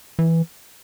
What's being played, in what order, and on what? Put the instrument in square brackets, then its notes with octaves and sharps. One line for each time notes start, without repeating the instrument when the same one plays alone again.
[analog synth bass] E3